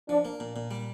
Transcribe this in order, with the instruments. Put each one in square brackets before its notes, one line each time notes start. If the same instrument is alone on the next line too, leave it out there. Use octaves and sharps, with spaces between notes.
[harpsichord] F3 [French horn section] D4
[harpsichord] A#3
A#2
A#2
G3